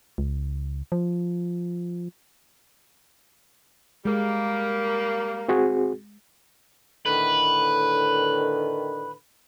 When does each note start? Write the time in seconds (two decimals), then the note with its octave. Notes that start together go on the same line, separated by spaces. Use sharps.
0.18 C#2
0.92 F3
4.05 G3 G#3 A#3
5.48 C4 F#4 G#4
7.06 A2 D3 D#3 B4